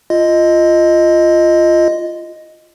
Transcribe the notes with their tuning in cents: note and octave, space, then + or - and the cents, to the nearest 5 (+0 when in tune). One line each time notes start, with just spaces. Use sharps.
F4 -15 D#5 +0